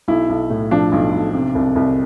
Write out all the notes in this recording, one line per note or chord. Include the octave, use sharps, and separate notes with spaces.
B1 E4
B1
A2
F3 D4
B1
B1
C3
C2
C2